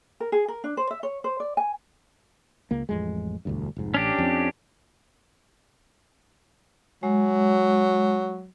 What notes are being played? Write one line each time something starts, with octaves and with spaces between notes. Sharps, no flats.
A#4
G#4
A#4
D4
C5
E5
C#5
C5
D5
G#5
C#2 A#3
A1 F2 G#3
E1 D2 G2
F1 G#2
A1 C#4 D4 G4
F2 C4
F#3 G#3